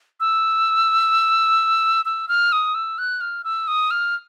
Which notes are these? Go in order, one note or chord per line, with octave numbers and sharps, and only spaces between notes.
E6
E6
F6
D#6
E6
F#6
F6
E6
D#6
F6